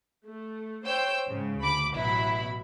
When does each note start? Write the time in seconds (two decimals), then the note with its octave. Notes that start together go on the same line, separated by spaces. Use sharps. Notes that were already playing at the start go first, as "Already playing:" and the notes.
0.24 A3
0.85 C5 C#5 G5 E6 G6
1.28 G#2 C#3
1.60 D2 B5 D6
1.93 A1 B2 F#3 E4 B5